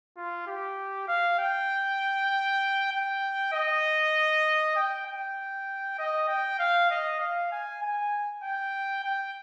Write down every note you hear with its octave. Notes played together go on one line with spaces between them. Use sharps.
F4
G4
F5
G5
G5
D#5
G5
G5
D#5
G5
F5
D#5
F5
G#5
G#5
G5
G5